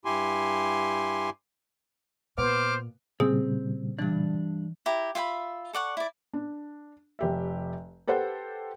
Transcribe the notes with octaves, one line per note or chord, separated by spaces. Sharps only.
G2 E4 G4 G#5 C6
A#2 B3 C5 D6 F6
A#2 C#3 G3 C4 G#4
G2 E3 D4
E4 G4 A#5
F4 E5 G5 B5
A4 D5 F#5 C#6
E4 D5
D4
F1 G4 E5
G4 A4 B4 C5 F#5 G5